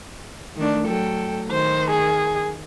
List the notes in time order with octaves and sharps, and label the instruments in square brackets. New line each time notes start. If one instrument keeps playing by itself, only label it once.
[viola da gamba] D#3 A3 D4
[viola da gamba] F#3 A4 [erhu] G5
[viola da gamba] D#3 [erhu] C5
[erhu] G#4